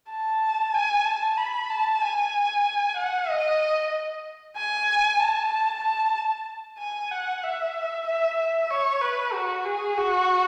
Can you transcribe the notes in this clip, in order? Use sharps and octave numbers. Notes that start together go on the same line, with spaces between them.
A5
G#5
A5
B5
A5
G#5
F#5
D#5
G#5
A5
A5
A5
G#5
F#5
E5
E5
E5
C#5
B4
F#4
G#4
F#4